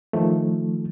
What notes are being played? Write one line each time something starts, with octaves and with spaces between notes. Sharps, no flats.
D#3 F3 A3